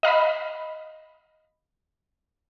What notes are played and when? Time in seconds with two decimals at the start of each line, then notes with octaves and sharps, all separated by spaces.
0.03 D#5 F5 A#5 B5